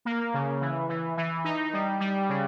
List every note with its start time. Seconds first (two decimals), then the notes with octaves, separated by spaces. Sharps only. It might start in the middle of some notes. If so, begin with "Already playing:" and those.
0.05 A#3
0.34 C#3
0.61 E3
0.89 E3
1.17 E3
1.44 D#4
1.73 G3
2.00 G3
2.29 C#3